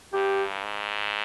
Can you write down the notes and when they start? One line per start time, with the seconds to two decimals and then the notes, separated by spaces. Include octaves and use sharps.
0.13 G2 G4
0.64 G#2